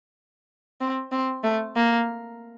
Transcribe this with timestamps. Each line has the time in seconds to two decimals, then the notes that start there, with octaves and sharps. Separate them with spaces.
0.81 C4
1.12 C4
1.43 A3
1.76 A#3